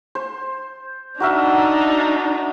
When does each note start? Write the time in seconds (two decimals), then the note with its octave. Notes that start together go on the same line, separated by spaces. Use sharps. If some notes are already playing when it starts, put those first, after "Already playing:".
0.15 C5
1.20 D4 D#4 F#4 A#4 E5